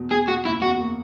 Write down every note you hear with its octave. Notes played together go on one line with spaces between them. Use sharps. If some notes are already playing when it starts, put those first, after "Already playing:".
Already playing: E2 B2
E2 G#4
B2 F#4
F#1 E4
E2 F#4
A#3